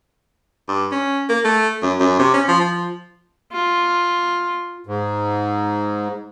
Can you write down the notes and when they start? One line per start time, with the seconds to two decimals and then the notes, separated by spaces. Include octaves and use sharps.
0.68 G2
0.92 C#4
1.29 A#3
1.44 A3
1.82 F#2
2.00 F#2
2.19 C3
2.34 C#4
2.48 F3
2.60 F3
3.53 F4
4.87 G#2